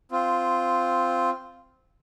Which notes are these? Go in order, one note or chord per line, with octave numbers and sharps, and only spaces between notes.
C4 F4